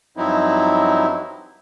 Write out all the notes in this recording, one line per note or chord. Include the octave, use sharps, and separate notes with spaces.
G2 F3 F#3 C4 D#4 E4